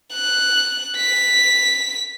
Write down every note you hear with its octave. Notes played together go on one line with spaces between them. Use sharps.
F#6
B6